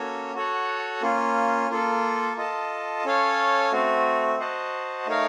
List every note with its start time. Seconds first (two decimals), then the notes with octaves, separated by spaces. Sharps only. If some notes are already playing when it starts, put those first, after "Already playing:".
Already playing: A#3 C#4 F#4 A4 C#5
0.35 F#4 A4 C#5 F#5
1.02 A#3 C#4 F4
1.70 A#3 F4 A4
2.37 F4 A4 D#5 A5
3.05 C#4 A4 C#5 F5
3.72 A3 C4 F#4
4.40 F#4 C5 D#5 F#5 A5
5.07 A3 D#4 A#4 C#5 F5